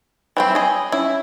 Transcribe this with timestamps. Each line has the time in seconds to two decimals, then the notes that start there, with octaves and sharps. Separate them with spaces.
0.37 E3 G3 C4 C#5 G5 B5
0.55 G#4 D#5
0.92 C#4 E4 C#5